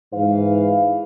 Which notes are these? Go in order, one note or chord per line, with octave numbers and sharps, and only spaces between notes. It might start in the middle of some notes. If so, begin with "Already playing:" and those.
G#2 E3 B4 F5